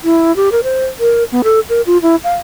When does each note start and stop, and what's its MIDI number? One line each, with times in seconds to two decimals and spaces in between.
0.04 0.34 64
0.36 0.49 67
0.52 0.61 70
0.64 0.85 72
1.00 1.24 70
1.32 1.42 59
1.44 1.60 69
1.69 1.82 70
1.86 1.98 65
2.02 2.16 64
2.24 2.34 77